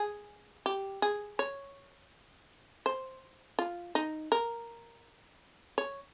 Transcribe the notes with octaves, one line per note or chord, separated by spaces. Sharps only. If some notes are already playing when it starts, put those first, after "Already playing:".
Already playing: G#4
G4
G#4
C#5
C5
F4
D#4
A#4
C#5